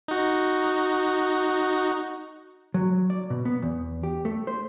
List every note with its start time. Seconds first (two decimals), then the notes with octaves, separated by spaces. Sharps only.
0.08 D#4 F#4
2.74 F#3
3.10 D5
3.30 B2
3.45 B3
3.62 E2
4.03 G4
4.25 A3
4.47 C5